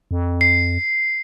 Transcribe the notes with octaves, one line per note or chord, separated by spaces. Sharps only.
F2
C7